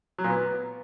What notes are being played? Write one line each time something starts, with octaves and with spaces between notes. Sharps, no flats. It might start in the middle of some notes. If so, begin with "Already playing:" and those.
F#3
A#2
B3